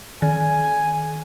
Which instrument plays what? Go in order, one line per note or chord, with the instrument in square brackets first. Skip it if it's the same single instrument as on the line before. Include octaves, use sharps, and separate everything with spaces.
[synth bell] D#3 [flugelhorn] G#5